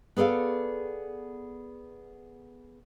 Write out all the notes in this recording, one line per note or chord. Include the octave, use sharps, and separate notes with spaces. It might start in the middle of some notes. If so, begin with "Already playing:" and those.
B3 G#4 A4 D5 F5